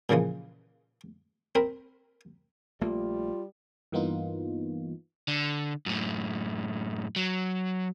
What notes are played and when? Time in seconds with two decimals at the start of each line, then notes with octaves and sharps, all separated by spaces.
0.09 A#2 C#3 E3 F3 G#3
1.55 C4 A#4 B5
2.81 A#1 G3 A3 A#3 F4
3.92 G2 E3 A#3 B3 D#4 F4
5.28 D3
5.86 F#2 A2
7.16 F#3